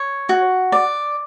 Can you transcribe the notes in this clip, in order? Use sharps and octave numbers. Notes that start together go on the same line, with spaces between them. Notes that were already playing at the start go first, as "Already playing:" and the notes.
Already playing: C#5
F#4
D5